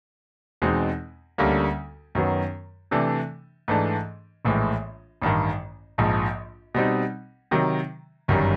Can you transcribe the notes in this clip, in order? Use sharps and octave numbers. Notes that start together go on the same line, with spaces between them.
E2 B2 G#3 C4 D#4
D2 D3 G3 A#3 C#4
F#2 D#3 F#3 B3
C3 E3 A3 D4
G#2 E3 A3 D4
A#1 A2 E3 G#3
A1 G2 D#3
A#1 G#2 F3
B2 G3 C4 D#4
C3 D#3 F#3
G1 F#2 D#3 G3